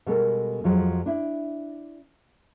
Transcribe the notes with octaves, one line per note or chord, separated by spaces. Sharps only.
B2 G3 G#3 A4 A#4
F2 F3 F#3 G#3
D4 E4